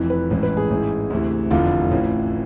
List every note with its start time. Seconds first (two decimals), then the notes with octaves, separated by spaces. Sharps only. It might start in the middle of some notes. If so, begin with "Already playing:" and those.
Already playing: F1 F2 E3
0.10 B4
0.30 A1 G#2 E3
0.43 B4
0.57 G#4
0.70 A1 G#2 E3
1.10 D2 C3 E3
1.51 F1 E2 D3 F4
1.91 A1 A2 E3